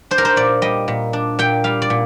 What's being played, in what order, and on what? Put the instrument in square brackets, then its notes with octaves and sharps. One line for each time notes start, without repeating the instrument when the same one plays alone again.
[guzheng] D4 C5
A#4
C5
A#2 D5
G3 D#5
A#2
D4
A#2 G5
G3 F5
D5
A#2